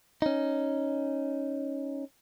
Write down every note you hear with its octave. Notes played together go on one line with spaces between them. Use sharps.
C#4 D#4